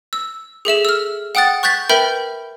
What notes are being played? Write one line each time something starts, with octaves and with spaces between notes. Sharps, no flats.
E6
G#4 A4 E5 E7
E6 F6
F#5 G5 D#6 F#6 A6
C#6 F#6 G6 A6 B6
A#4 B4 E5 G5 B5 G6